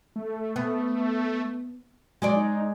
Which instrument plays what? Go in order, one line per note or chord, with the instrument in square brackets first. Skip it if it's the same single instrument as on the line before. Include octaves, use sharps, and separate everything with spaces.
[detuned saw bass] A3
[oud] B3
[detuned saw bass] F#3 [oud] G#3 G#4 D5
[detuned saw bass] D#4